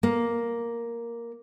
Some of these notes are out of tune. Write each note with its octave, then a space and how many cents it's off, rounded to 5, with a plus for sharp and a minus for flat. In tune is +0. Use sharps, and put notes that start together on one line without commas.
A#3 +5